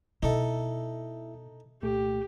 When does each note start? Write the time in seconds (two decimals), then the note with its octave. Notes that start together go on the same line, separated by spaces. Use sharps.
0.23 B2 D#4 E4 A4 E5
1.82 C2 A#2 A3 G4